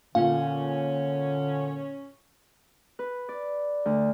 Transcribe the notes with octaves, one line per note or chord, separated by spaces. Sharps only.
A#2 D3 C#4 F5
B4
D5
D2